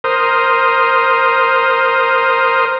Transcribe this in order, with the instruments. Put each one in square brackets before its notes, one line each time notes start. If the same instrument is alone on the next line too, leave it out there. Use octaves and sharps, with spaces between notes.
[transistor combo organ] A#4 C5 D#6